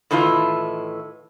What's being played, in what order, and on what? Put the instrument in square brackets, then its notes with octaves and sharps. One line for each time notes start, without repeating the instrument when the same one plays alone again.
[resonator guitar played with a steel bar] A2 D#3 E3 E4 F4